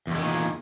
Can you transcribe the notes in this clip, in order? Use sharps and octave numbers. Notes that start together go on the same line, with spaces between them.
E2 A#2 D#3 F#3 G#3